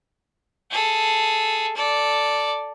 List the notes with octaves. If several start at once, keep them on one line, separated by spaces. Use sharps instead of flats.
G#4 A4
A4 D5